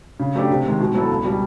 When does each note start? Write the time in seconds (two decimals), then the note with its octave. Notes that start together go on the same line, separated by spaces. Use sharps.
0.20 C#3
0.35 F#3 A3 D4 G4
0.50 C3
0.66 D#3 G#3
0.80 B2
0.94 F#3 B3 E4 A4
1.11 C#2
1.24 B2 G3